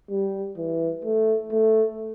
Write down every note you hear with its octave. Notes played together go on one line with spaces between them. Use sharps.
G3
E3
A3
A3